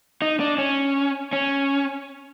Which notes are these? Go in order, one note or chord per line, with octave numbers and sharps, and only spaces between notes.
D#4
D4
C#4
C#4